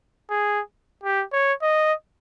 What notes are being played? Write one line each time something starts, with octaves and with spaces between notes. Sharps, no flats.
G#4
G4
C#5
D#5